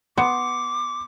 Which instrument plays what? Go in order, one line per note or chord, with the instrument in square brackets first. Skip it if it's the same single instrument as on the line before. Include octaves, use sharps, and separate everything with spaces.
[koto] B3 [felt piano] C6 C#7 [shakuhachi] D6